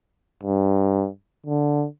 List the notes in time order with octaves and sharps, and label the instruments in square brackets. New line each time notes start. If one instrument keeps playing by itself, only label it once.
[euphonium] G2
D3